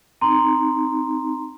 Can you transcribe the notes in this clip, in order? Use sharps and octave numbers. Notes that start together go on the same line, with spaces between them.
C4 D#4 A#5 C6